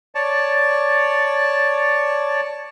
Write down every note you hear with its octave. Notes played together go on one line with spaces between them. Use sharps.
C#5 D5 A5